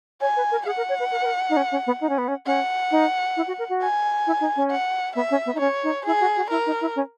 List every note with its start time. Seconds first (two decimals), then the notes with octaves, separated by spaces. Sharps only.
0.21 C#5 G#5
0.36 B4
0.51 A#4
0.66 G#4 F#5
0.77 A#4
0.89 C#5
1.00 B4
1.11 A#4
1.21 B4
1.26 A#4
1.50 D#4
1.57 C#4
1.72 C#4
1.87 B3
2.01 D#4
2.09 C#4
2.18 B3
2.28 C#4
2.46 C#4 F#5
2.91 D#4
3.37 E4
3.48 F#4
3.59 A#4
3.69 F#4
3.81 G#5
4.27 E4
4.40 D#4
4.56 C#4
4.71 F#5
5.15 B3 E5
5.31 C#4
5.46 B3
5.55 D#4
5.60 C#4 C#5
5.83 D#4
6.06 E4 G#4
6.20 F#4
6.37 F#4
6.50 E4 A#4
6.66 D#4
6.81 E4
6.96 C#4